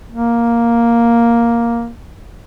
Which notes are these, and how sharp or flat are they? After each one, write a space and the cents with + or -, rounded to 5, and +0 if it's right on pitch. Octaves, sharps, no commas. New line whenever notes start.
A#3 +5